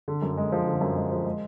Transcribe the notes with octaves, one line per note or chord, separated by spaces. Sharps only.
D3
F#2
G#3
F3
D3
F#2
G#3
F3
G#3